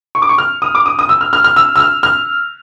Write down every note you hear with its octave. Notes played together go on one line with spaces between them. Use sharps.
C#6
D6
C#6
F6
D#6
D6
D#6
D#6
E6
F6
F6
F6
E6
E6
F6
F6